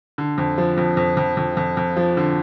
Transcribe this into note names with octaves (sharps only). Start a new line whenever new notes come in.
D3
F2
F3
F2
F2
F2
F2
F2
F2
F3
D3